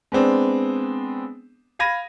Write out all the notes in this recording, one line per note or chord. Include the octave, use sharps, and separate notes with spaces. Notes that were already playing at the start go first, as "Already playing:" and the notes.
G#3 B3 C4 D4
F5 B5 G#6 A#6 D#7